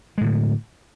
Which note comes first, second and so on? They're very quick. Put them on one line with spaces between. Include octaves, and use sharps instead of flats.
G#3 A2 D3